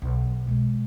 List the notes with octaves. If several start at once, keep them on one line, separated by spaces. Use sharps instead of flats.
B1
B2 G#3